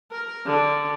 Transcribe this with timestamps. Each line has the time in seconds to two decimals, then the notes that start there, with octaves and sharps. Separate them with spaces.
0.11 A#4
0.46 D3